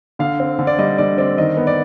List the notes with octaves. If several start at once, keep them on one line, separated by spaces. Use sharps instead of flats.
D3 F5
C4
D3
D5
G3 D#5
D3 D5
C4 D5
D#3 D#5
B3
D5